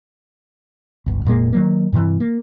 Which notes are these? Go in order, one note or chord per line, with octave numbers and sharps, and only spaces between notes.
G1 C#2
F1 A#2 G#3 A#3
D#3 F#3 A#3
G2 C3 D#3 E3
A#3